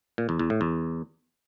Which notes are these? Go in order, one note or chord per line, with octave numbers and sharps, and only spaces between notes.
A#2
E2
E2
A2
E2